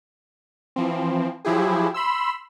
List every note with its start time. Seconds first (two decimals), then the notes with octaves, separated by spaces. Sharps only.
0.76 E3 F3 C4
1.45 F3 F#3 E4 G4 G#4
1.94 B5 C6 E6